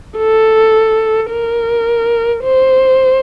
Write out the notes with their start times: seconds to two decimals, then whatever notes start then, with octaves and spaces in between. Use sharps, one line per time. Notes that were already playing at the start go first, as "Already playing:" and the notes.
0.18 A4
1.30 A#4
2.44 C5